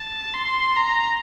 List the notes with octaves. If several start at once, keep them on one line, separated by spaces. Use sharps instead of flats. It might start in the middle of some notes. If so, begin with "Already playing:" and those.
Already playing: A5
C6
A#5